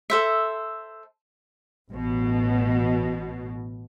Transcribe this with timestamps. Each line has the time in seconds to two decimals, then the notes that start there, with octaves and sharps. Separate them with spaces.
0.10 A4 C5 E5
1.90 A1 B2